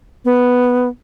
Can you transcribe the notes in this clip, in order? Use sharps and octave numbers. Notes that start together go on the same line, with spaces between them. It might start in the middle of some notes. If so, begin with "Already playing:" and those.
B3